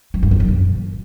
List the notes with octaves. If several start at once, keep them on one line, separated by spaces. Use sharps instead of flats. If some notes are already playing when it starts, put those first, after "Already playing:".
F#3
G2
F2
F#2
A#2